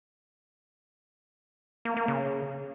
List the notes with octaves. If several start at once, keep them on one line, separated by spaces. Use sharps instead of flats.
A#3
A#3
C#3